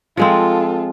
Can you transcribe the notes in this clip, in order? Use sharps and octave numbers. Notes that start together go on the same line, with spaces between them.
F3 G#3 C4 F4 A4